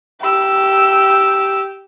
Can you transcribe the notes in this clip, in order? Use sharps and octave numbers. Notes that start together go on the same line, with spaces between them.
G4 E6